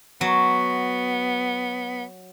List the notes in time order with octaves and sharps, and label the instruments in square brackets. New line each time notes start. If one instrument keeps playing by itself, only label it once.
[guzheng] F#3 [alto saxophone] B3